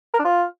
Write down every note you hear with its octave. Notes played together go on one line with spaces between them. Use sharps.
A#4
D4
F4